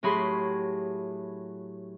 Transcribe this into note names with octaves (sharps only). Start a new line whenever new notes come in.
A2 F#3 G4 G#4 B5 C6